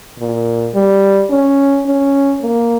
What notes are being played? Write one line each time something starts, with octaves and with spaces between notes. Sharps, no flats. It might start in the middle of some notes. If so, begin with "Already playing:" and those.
A#2
G3
C#4
C#4
A#3